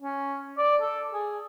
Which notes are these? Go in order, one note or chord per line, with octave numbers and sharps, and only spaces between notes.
C#4
D5
A4
G#4